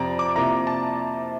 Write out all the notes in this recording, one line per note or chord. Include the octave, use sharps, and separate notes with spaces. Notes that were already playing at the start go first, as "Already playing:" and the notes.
Already playing: F2 C3 F3 C4 G4 D5 A#5
D6
C3 F3 A#3 E4 A#5
A5